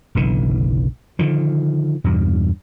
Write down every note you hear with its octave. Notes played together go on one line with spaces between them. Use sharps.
F#1 B1 D3 E3
D3 D#3 F3
E2 G2 B2